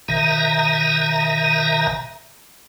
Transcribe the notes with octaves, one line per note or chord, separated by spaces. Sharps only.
G#1 B2 D#3 E5 A#5